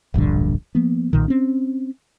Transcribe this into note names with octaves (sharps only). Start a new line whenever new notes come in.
D1 A#1 G2 D3
F3 A#3 B3
B1 A#2 D#3
C4 C#4